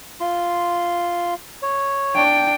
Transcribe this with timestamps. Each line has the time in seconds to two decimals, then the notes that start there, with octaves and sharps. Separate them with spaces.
0.21 F4 C6
1.63 C#5
2.14 D4 G5